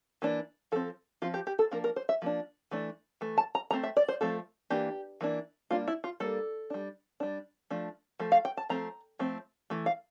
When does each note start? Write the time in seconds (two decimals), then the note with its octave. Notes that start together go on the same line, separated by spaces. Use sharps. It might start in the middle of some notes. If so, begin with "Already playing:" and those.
0.22 E3 A#3 D4
0.72 F3 C4 A4
1.22 F3 C4 F4
1.34 G4
1.47 G4
1.59 A4
1.71 F3 A#3 D4 A#4
1.84 A#4
1.96 C5
2.09 E5
2.22 F3 A#3 D4
2.71 E3 A3 D4
3.21 E3 A3
3.38 A5
3.55 A#5
3.71 F3 A3 C4 A#5
3.83 E5
3.97 D5
4.08 C5
4.21 F3 A3 C4 A4
4.70 E3 A#3 D4 G4
5.21 E3 A#3 D4
5.70 G3 A#3 D4 F4
5.88 E4
6.04 F4
6.20 G3 A#3 D4 A4
6.70 G3 D4
7.20 G3 D4
7.70 F3 A3 D4
8.19 F3 A3
8.32 F5
8.45 G5
8.57 A5
8.69 F3 A3 C4 A#5
9.19 F3 A3 C4
9.70 E3 A3
9.86 F5